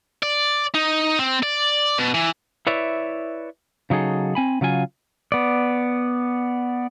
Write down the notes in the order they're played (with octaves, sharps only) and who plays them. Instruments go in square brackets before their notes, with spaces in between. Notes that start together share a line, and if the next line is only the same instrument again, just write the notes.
[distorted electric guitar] D5
D#4
C4
D5
B2
E3
[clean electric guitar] E4 B4 C#5 D5 E5
C#3 F#3 D#4 G#4 A4
C4 G#5 B5
C#3 F#3 F4 G#5
[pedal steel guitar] B3 D5